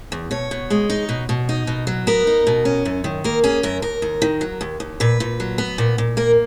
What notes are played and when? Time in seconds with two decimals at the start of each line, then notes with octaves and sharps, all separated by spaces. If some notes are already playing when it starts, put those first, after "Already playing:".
0.12 E2
0.31 B2 C#5
0.51 B2
0.70 G#3
0.90 D#4
1.09 B2
1.29 B2
1.49 D#4
1.67 B2
1.87 F#3
2.07 B3 A#4
2.27 D#4
2.47 B2
2.65 C#4
2.85 F#2
3.04 D#3
3.24 A#3 A#4
3.44 C#4 G#4
3.63 F#2 A#4
3.82 D#2 A#4
4.02 D#2
4.22 D#3
4.41 F#3
4.61 D#2
4.80 D#2
5.00 A#2 B4
5.20 A#2
5.40 F#3
5.58 B3
5.78 A#2
5.98 A#2
6.17 A#3 A#4